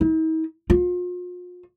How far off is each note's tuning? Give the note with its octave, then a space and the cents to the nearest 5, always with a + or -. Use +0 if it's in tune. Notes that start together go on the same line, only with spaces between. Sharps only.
D#4 +45
F4 +40